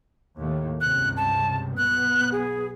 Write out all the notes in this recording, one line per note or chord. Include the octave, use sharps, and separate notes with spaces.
D#2 A2
C#2 G2 C3 F#6
A5
B1 B3 F#6
G#4